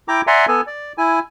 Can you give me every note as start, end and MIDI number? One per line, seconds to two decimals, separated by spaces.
0.08 0.21 64
0.08 0.21 79
0.08 0.21 82
0.08 0.21 86
0.27 0.46 74
0.27 0.46 76
0.27 0.46 78
0.27 0.46 80
0.27 0.46 82
0.27 0.46 84
0.48 0.61 59
0.48 0.61 69
0.48 0.61 80
0.67 0.93 74
0.98 1.19 64
0.98 1.19 80